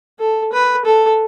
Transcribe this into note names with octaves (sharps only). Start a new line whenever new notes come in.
A4
B4
A4